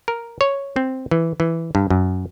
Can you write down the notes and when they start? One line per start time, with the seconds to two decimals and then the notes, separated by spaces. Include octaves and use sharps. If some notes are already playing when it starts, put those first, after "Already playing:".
0.08 A#4
0.41 C#5
0.76 C4
1.11 E3
1.40 E3
1.75 G2
1.90 F#2